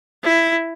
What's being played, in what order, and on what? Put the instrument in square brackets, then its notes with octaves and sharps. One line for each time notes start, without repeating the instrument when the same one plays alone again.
[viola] E4